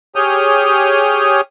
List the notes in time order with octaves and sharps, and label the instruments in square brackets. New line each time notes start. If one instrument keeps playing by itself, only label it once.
[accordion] G4 G#4 C#5 D#6 F6 G6